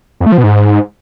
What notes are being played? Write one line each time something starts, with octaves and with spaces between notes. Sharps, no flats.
F2
A3
F3
B2
G#2